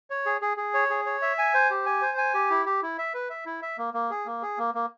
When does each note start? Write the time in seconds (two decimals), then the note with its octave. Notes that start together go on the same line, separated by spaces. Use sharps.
0.10 C#5
0.26 G#4
0.42 G#4
0.57 G#4
0.74 C#5
0.90 G#4
1.06 C#5
1.22 E5
1.38 G#5
1.54 C5
1.70 G4
1.86 G#5
2.02 C5
2.17 G#5
2.34 G4
2.50 E4
2.66 G4
2.82 E4
2.98 E5
3.14 B4
3.30 E5
3.46 E4
3.62 E5
3.78 A#3
3.94 A#3
4.10 G#4
4.26 A#3
4.42 G#4
4.58 A#3
4.74 A#3